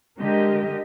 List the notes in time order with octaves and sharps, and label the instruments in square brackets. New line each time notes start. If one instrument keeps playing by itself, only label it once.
[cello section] D3 G#3 G4 A#4 D#5